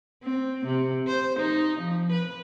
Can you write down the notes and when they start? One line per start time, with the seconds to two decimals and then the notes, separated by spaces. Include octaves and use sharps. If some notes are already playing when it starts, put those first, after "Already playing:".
0.23 C4
0.66 C3
1.07 C5
1.39 D#4
1.79 F3
2.12 B4